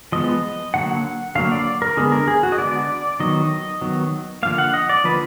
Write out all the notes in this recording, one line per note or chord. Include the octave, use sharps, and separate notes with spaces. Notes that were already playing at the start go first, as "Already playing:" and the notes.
F3 G#3 B3 D#5
D3 F#3 A#3 F#5
D3 F#3 A#3 F5
D5
A#4
D3 G#3 B3 G#4
A#4
G#4
F#4
D#5
D3 G#3 B3 D5
D#3 F#3 B3 D#5
D#3 F#3 B3
D3 F3 A#3 F5
F#5
D#5
D5
D3 F3 A#3 B4